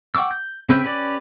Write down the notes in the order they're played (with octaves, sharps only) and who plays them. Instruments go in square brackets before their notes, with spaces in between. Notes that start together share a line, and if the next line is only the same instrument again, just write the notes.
[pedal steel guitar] F#5 G5 C#6 D6 E6
G6
C#3 C4 B4 E5 G5
C#4 G4 B4 D5